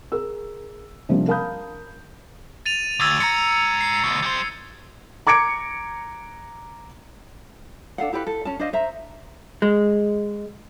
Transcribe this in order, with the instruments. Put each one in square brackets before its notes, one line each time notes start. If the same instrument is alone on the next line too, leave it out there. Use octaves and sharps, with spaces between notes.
[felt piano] G#4 A#4 E6
C3 F3 G3 A#3 C#4 D4
A#4 F5 A5 B5 D#6 G6
[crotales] A6 D#7 F7
[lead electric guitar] D2 [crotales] E6 G#6 A6
[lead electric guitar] G#2 A#5 [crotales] C#7
[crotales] C7
[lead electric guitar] D2 B2
G3 C5
[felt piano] A#5 D6 G#6 C#7 D7
[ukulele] D4 A4 F5 F#5
E4 G4 A4 B4
A4
C#4 A5
D4 C5 D#5 F5
C5 E5 A#5
[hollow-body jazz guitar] G#3